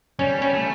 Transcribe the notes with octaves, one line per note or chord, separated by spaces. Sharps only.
G3 C#4
C#4
A3